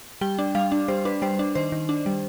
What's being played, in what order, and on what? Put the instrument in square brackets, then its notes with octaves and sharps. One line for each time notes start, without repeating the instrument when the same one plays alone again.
[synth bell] G3 G5
D4
G3 F5
D4
G3 C5
D4 B4
G3 C5
D4
D#3 C5
D#3
D4
G3